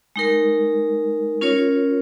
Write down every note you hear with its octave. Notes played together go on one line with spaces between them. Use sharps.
G#3 D#4 A#4
C#4 F4 A#4 C#5